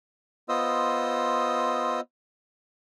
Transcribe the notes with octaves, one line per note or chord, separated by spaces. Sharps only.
B3 F4 C5 D#5 D#6 E6